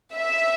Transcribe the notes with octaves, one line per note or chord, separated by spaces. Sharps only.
E5